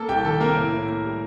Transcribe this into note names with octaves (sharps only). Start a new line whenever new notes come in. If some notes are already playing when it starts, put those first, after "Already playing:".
Already playing: A#3 A4 A5
C2 G4 G5
D#3 A4
C3 A#3 A#4
A2
A2
A#3
G3